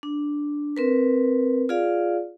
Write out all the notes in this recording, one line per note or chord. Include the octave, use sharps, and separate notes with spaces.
D4
C4 A#4 B4
F4 G#4 D5 F5